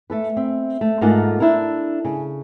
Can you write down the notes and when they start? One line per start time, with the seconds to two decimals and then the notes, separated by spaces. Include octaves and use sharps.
0.10 A3 A4 B4
0.37 C4 E5
0.81 A3
1.01 G#2 A3 A#3 F4 A4 F#5
1.40 D4 E4 A4 A#4
2.05 C#3